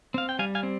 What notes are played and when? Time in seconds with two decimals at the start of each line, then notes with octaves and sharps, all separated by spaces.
0.14 C4 F5
0.29 G5
0.39 G3 F5 G#5
0.55 F5 G#5
0.63 C4